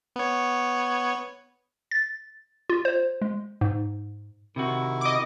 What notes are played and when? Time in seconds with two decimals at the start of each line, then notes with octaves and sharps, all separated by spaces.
0.16 B3 C#5
1.91 A6
2.70 F4
2.85 C5
3.22 G#3
3.61 G#2
4.56 C3 D#3 E4 F#4
5.01 D#5 D6